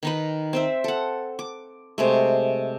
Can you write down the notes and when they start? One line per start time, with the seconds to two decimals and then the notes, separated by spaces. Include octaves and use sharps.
0.03 D#3 D#4 B4
0.53 C4 C5 E5
0.84 A4 F#5
1.39 D6
1.98 C3 G#3 A3